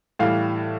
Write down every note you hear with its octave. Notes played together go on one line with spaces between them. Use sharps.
A2 E3 G3 F5